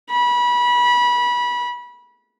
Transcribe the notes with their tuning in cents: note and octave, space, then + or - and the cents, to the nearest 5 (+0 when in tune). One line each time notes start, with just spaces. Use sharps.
B5 -25